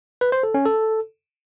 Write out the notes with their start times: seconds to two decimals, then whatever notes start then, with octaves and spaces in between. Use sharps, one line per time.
0.21 B4
0.32 C5
0.43 A4
0.54 C#4
0.65 A4